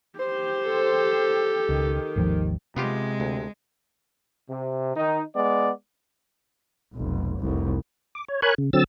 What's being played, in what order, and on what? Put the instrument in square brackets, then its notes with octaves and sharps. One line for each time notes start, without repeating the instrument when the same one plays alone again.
[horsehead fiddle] G4 [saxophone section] C5
[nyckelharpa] A4
[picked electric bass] C#2 [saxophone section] D#3
[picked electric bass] G#1 D#2 F3
[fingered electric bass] C3 [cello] G#3 [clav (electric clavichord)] B3 F4 G4
[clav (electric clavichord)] D2
[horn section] C3
D#3 D#4
G#3 B3 D5
[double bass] F1 B1
F1 C2
[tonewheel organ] D6
C#5
A#4 C#5 G#5 B5 C#6 F#6
C#3
D3 F#3 C4 E6 A6